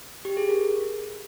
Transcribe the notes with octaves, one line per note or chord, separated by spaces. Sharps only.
G4
G#4
A#4